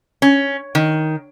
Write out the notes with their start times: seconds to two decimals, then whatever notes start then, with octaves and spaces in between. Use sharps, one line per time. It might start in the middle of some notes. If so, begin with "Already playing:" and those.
0.22 C#4
0.75 D#3